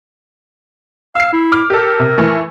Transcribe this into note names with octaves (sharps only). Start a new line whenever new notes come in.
F5 E6 C7
E4
D6 F6
G4 A4 A#4
C3
E3 A3